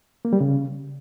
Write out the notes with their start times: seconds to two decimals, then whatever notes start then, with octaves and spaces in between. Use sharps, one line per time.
0.25 A#3
0.33 G3
0.41 C#3